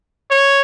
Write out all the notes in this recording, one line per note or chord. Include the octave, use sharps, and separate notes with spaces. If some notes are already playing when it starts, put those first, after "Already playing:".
C#5